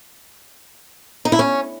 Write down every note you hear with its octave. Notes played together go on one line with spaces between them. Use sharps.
D#4
E4
C#4